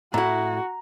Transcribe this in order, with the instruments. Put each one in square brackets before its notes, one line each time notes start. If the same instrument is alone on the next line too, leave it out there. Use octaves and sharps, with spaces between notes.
[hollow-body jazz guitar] A2 E4 [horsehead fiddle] F#4 [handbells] A#5